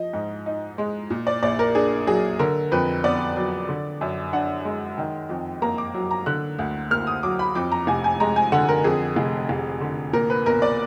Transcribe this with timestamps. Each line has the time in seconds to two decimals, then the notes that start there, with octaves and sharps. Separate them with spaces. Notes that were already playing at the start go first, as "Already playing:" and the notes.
Already playing: F3 D#5
0.13 G#2
0.46 D#4
0.78 G#3
1.10 A#2
1.27 D5
1.43 A#1 D5
1.59 A#4
1.75 D4 G#4
2.07 F#3 G#4
2.39 D3 A#4
2.72 F2 B4
3.04 B3 D5
3.36 F#3
3.69 D3
4.01 F#2
4.33 D4 F#5
4.65 G#3
4.98 D#3
5.29 F2
5.62 A#3 A#5
5.78 D6
5.94 F#3
6.11 A#5
6.26 D3 F#6
6.59 D2
6.91 A#3 F6
7.07 D#6
7.23 F#3 D6
7.39 B5
7.55 F2 D6
7.72 A#5
7.87 F1 G#5
8.04 G#5
8.20 G#3 A#5
8.36 G#5
8.52 D3 F#5
8.69 A#4
8.84 F2 G#4
9.16 F1
9.49 F1
9.81 D3
10.13 A#2 A#4
10.30 B4
10.46 B1 A#4
10.62 D5